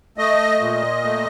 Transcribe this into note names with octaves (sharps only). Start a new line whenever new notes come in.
A3 D#5
A#2
A3